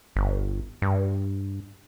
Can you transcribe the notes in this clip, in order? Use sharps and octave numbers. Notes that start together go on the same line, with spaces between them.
G1
G2